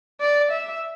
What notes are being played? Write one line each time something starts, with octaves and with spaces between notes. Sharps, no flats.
D5
E5